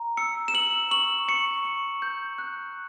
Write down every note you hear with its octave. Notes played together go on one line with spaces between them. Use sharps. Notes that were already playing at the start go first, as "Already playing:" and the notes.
Already playing: A#5
E6 C#7
E7
E6 F#7
C#6 F#7
C#6 C#7
C#6
G6
F#6